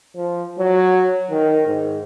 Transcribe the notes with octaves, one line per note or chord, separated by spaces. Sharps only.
F3
F#3
D#3
G#2